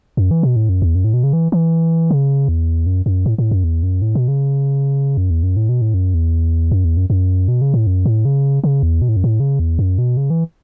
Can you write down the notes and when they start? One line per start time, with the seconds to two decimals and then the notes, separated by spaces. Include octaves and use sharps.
0.17 F#2
0.31 E3
0.43 B2
0.56 A2
0.69 F#2
0.82 E2
0.95 F#2
1.04 A2
1.14 B2
1.24 C#3
1.33 E3
1.52 E3
2.11 C#3
2.49 E2
2.86 F#2
3.06 F#2
3.26 A2
3.38 A2
3.51 F#2
3.64 E2
3.83 F#2
4.02 A2
4.15 B2
4.28 C#3
5.17 F#2
5.30 E2
5.43 F#2
5.57 A2
5.69 B2
5.81 A2
5.94 F#2
6.14 E2
6.71 F#2
6.85 E2
6.97 F#2
7.10 F#2
7.48 B2
7.61 C#3
7.74 A2
7.87 F#2
8.06 A2
8.25 C#3
8.64 C#3
8.83 E2
9.02 B2
9.09 A2
9.17 F#2
9.24 A2
9.40 C#3
9.59 E2
9.79 F#2
9.98 B2
10.17 C#3
10.30 E3